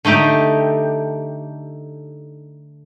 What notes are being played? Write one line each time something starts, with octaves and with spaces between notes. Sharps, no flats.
D3 A3 D#4 G4